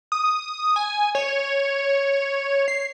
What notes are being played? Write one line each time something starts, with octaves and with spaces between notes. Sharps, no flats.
D#6
G#5
C#5
C7